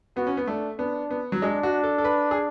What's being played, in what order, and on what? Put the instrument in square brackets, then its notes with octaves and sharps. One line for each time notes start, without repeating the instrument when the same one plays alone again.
[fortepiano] B3 [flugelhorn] F#4
[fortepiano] C#4
B3
[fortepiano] A3 [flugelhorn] D4
[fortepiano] B3 [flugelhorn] D4
[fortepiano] B3
F#3
[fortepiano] G#3 [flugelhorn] D4
[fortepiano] F#4
A4
A4
B4
G#4